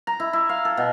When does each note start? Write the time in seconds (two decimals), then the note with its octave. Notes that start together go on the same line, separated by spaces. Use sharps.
0.07 A#5
0.20 E4
0.33 E4
0.49 F5
0.65 A4
0.77 B2